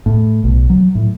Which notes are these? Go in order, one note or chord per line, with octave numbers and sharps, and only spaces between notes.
A2
B1
F#3
A2